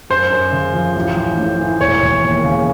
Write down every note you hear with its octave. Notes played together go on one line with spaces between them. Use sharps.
F#2 C5
F#2
C#3
F3
A1
A1
A2
E3
E1 C#5
E1
D#2
C#3